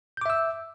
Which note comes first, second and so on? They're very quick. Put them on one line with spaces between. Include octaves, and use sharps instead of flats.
G6 D6 E5 E6